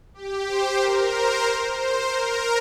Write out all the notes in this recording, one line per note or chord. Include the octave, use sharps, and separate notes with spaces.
G4
C5
A#4
C5
C5
A#4